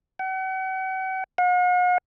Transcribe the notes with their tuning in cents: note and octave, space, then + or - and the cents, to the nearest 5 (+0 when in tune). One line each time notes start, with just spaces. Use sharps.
F#5 +40
F#5 -45